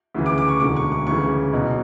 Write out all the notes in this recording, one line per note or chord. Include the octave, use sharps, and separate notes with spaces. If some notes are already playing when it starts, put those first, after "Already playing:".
D2 C#3 E3
D6
D6
C#6
E1 D2 D3 D6
C#6
C#6
D2 C#3 E3 C#6
B1 B2